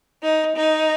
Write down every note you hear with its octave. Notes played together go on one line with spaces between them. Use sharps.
D#4
D#4